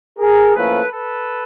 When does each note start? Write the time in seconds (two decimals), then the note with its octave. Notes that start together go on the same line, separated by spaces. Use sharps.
0.19 G#4 A#4
0.55 A2 F3 A#3 C#4 A4 B4
0.91 A4 B4